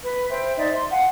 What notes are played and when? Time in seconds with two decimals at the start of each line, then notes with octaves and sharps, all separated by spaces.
0.03 B4
0.30 C5 E5 G5
0.57 D#4 C5 D5 E5
0.74 C6
0.91 F5 F#5 G#5